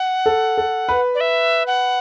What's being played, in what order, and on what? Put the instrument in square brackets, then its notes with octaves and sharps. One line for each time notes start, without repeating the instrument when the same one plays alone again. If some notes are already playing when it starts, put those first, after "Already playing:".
Already playing: [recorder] F#5
[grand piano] A4
A4
B4
[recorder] D5
E5
F#5